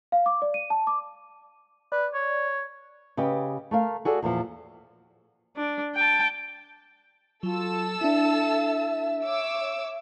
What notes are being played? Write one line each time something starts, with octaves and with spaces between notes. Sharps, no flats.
F5
D6
D5
D#7
A5
D6
B4 D5
C#5
C#3 G4 B4 D#5
A3 A#4 F5
F#4 G#4 A4 D5
E2 A#2 F3
D4
G5 A5
F#3 F4 A4 A5 E6
D4 E4 E5
C#5 D6 E6